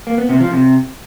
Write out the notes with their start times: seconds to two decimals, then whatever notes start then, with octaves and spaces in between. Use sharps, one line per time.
0.07 A#3
0.18 B3
0.29 C3
0.40 F3
0.52 C3